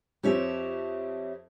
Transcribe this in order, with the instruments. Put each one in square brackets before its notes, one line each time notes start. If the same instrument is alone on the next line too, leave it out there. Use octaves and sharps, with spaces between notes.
[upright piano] F2 C4 [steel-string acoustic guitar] G4 C#5 E5